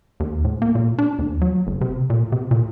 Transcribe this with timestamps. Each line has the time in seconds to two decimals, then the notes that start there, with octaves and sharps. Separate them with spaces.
0.20 D#2
0.45 A2
0.62 A#3
0.75 A#2
0.99 D4
1.19 D#2
1.41 F#3
1.67 F#1
1.81 C3
2.10 A#2
2.32 C3
2.51 A#2